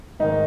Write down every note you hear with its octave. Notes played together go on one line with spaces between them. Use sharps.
G#2 D#3 D#4